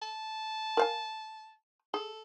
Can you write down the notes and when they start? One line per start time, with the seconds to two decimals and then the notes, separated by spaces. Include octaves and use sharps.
0.02 A5
0.77 A#4 F5 G#5
1.94 G#4 A4